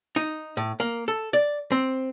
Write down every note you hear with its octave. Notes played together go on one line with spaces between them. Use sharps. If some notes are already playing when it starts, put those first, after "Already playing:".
D#4
A2
A#3
A4
D5
C4